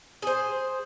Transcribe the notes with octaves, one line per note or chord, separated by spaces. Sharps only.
G#4 C5